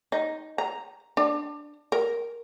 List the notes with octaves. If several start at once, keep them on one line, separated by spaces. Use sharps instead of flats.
D#4
A#5
D4
A#4